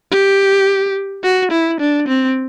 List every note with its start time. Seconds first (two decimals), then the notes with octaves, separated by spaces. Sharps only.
0.11 G4
1.23 F#4
1.51 E4
1.80 D4
2.08 C4